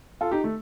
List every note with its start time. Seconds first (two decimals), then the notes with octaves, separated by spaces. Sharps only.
0.21 F4 A4
0.31 D#4 G4
0.44 A3